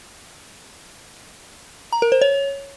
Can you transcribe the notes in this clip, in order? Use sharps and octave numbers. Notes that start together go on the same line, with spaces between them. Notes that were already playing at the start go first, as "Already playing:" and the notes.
A#5
A#4
C5
C#5